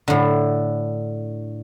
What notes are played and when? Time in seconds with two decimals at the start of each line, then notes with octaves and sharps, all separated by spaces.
0.08 A2 D3